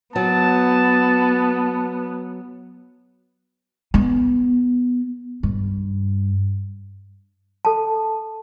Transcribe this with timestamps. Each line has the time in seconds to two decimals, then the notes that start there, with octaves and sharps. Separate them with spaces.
0.16 F#3 B3 A5
3.94 B3
5.43 G2
7.65 A4 A5